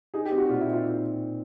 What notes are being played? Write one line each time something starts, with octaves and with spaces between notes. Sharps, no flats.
D#4 G#4
G4
C4
F#4
A#2 F4
E4
D#4
F4